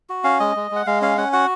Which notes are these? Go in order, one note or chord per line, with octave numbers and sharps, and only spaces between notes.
F#4
C#4 F5
G#3 D#5
G#3
G#3 F#5
G#3 F5
C#4 F5
C#4 F#5
F#4 F#5